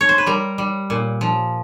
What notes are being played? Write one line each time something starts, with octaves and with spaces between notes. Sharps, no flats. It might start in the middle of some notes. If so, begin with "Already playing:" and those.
C#5
C5
B4
G3 A#4
G3
A#2
F3